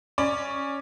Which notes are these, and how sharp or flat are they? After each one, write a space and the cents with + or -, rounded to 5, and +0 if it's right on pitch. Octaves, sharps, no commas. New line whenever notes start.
C#4 +0 D5 +15